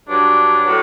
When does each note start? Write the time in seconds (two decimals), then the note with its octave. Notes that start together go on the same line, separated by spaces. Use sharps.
0.07 G2 F#3 D4
0.65 A2 F#3